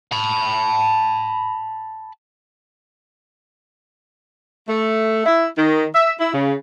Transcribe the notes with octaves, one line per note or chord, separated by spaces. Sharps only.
A5 B5
A3
E4
D#3
E5
E4
C#3